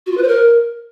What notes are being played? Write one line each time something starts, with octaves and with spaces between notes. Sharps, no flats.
F#4
F4
B4
C5
A#4